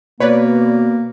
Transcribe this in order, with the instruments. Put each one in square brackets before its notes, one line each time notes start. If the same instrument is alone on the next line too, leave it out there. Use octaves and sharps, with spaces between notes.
[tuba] B2 [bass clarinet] A#3 [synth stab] B4 D5 [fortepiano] C#5